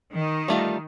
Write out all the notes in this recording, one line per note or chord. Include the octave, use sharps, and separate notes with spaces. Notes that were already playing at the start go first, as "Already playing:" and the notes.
D#3
G3 A3 F4